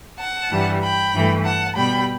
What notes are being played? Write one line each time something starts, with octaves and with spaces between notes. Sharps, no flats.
F#5 A5
G2 E3 G3
G5 B5
G2 E3 A3
F#5 A5
B2 G3 G5 B5